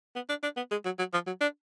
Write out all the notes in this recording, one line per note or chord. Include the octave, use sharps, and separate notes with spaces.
B3
D4
D4
B3
G#3
F#3
F#3
F3
F#3
D4